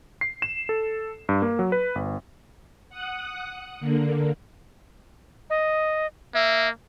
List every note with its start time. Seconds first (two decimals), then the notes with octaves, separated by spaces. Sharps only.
0.21 C7
0.42 E7
0.69 A4
1.29 G2
1.42 A#3
1.59 F#3
1.72 B4
1.95 G1
2.90 F#5 D#6 F#6
3.80 D3 A#3
5.50 D#5
6.34 A#3 E5